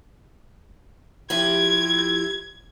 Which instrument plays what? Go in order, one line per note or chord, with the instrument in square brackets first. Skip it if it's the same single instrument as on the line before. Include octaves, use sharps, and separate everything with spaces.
[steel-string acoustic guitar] F3 E4 G4 [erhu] G#6